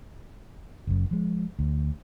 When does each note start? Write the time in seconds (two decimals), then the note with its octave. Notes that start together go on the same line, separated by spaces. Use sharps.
0.87 F#1 F#2
1.11 F3 G#3
1.59 D2